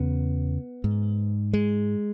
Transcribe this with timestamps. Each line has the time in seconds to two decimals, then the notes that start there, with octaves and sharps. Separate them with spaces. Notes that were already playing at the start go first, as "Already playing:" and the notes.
Already playing: E2 C#3 B3
0.84 G#2
1.53 G#3